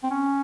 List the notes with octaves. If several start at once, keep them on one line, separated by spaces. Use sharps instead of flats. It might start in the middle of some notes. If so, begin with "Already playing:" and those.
C4
C#4